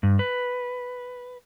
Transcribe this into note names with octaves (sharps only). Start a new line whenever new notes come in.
G2
B4